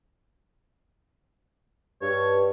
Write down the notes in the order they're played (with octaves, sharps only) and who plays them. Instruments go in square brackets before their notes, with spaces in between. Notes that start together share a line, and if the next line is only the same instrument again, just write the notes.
[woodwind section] G2 [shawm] C#5